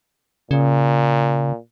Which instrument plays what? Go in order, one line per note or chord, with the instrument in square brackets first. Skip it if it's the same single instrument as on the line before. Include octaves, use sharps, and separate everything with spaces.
[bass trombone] A#2 [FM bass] C#3